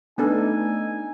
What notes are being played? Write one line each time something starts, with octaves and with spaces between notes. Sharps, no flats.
A3 B3 D4 D#4 A4 G#5